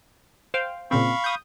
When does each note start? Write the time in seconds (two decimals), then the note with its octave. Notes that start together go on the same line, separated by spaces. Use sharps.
0.54 C5 F5 G5
0.91 A#2 C#3 C4 F5 B5 C#6
1.24 D#6 G6